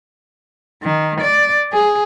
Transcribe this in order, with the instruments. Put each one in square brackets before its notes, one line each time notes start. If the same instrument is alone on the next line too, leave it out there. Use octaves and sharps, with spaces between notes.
[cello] D#3
D5
G#4